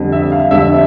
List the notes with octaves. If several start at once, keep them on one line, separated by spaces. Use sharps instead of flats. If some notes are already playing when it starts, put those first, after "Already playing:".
Already playing: F2 D3 G3
E5
F5
F2 D3 G3 E5